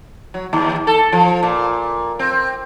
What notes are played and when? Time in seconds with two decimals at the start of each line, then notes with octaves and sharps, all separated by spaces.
0.34 F#3
0.53 D#2
0.87 A4
1.12 F3
1.43 A#2
2.19 C4